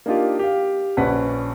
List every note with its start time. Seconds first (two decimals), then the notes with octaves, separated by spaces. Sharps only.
0.06 A#3 D4 D#4 F4 G4
0.39 G4 F5
0.97 A#1 C#4 B4 D5 F#5 B6